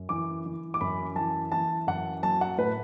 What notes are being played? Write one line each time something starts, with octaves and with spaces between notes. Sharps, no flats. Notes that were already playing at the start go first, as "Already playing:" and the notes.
Already playing: F#2
E3 D6
E3
D6
F#2 B5
E3 A5
E3 A5
F#2 F#5
F#3 A5
F#5
A2 B4